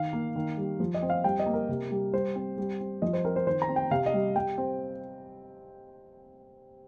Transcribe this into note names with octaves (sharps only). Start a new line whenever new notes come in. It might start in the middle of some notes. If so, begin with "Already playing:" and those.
Already playing: D#3 F5
A#3
D#3
G3
F3
D#5
C4
F5
G3 G5
D#5
A#3
A#4
C3
G3
G3 C5
C4
G3
C4
F3 D#5
C5
C4 A#4
C5
D#3 C5
A#5
C4
G5
C3 F5
D#5
G3
G3 G5
C4